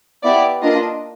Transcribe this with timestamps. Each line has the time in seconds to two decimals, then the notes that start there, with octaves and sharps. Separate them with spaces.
0.23 B3 E4 G4 D5
0.62 A#3 D4 F4 D#5